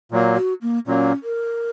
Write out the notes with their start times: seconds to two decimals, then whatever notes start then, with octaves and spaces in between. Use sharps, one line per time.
0.11 A#2 F#3 A#3
0.36 F#4
0.62 A#3
0.86 A#2 F#3 A#3 C#4
1.23 A#4